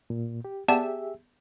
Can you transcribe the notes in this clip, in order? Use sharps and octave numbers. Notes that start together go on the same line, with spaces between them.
A#2
G4
B3 G4 G#4 D5 E5 A5